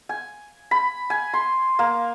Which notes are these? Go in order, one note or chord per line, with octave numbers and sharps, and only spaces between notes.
G#5
B5
G#5
C6
A#3